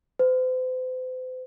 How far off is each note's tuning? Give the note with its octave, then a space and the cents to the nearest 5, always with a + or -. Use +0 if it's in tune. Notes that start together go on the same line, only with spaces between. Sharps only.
C5 -40